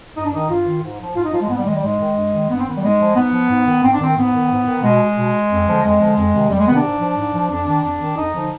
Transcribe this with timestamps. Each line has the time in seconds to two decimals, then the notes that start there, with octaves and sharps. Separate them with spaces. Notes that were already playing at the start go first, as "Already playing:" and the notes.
0.16 G2 D#4
0.26 D4
0.33 D#3 D#4
0.49 G2 F4
0.67 D#3
0.83 G#2
1.00 F3
1.16 G#2 F4
1.25 D#4
1.33 F3 F4
1.42 G#3
1.50 G#2 B3
1.58 G3
1.66 D#3 G#3
1.75 G3
1.83 G#2 G#3
1.99 D#3
2.16 G2
2.33 D#3
2.49 G2 B3
2.59 C4
2.67 D#3 B3
2.77 G3
2.83 G#2 G#3
2.99 F3
3.16 G#2 B3
3.33 F3
3.49 G#2
3.66 D#3
3.83 G#2 C4
3.93 D4
4.00 D#3 C4
4.16 G#2 B3
4.34 D#3
4.50 G#2
4.66 D#3
4.83 B2 G#3
5.16 B2
5.51 F2
5.67 D3 F3
5.83 F2 G#3
6.00 D3 F3
6.17 F2
6.34 C3 D#3
6.50 F2 G3
6.58 G#3
6.67 C3 D#3 B3
6.75 D4
6.84 G#2
7.00 F3
7.16 G#2
7.33 F3
7.50 F2 D4
7.67 D#3
7.83 F2
8.00 D#3
8.16 F2 D#4
8.33 D3 F3